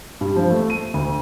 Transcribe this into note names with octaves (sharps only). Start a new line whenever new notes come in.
G2
F3
A3
D#7
D2